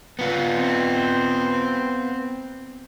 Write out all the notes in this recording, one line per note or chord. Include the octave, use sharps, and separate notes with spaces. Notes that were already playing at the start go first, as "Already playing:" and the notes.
B3 F4
C4